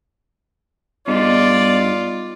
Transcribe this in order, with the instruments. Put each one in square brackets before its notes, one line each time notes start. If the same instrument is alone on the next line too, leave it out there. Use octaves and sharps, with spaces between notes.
[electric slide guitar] G2 D#4 [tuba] B3 [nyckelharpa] F4 [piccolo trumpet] D5